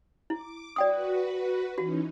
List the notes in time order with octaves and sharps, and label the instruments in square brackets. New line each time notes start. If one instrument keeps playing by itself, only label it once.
[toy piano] E4 [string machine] D6
[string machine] F#4 B4 [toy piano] D5 G5 D#6
[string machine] E3 C#4 D#4 [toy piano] F#4